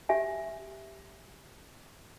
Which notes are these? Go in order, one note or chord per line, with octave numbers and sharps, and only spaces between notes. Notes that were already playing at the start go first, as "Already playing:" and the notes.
G4 E5 G#5